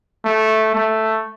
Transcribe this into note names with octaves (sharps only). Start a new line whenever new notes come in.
A3
A3